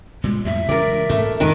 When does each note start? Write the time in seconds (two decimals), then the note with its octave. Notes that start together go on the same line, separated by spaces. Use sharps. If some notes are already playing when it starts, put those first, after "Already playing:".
0.24 A#2 G3 G#3
0.45 F2 A2 G3 E5
0.69 C#3 E3 G#3 A#4 D5
1.10 G#2 A3 A#3
1.40 F2 G#2 D#3 C4 A#4 B4